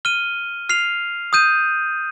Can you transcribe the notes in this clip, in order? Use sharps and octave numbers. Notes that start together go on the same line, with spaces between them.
F6 D#7 G7
F6 C7 F7
D#6 G6 D#7